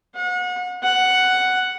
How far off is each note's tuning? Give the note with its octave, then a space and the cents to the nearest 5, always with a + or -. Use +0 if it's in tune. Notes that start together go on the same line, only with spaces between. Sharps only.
F#5 -35
F#5 +5